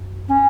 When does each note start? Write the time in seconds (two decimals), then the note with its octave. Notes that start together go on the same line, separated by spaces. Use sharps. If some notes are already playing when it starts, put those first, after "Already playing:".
Already playing: F#2
0.29 C#4